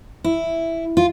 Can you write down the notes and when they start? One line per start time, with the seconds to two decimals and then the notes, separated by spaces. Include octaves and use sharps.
0.24 E4
0.97 F4